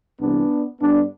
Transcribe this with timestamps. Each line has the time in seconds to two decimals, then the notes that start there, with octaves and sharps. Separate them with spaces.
0.21 C2 C3 E3 B3 D4
0.80 G2 D3 B3 D4